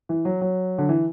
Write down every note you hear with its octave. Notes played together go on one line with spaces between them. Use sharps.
E3
F#3
F#3
D3
E3